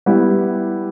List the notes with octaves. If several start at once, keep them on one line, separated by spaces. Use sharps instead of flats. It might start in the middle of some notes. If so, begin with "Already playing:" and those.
G3 B3 E4 G4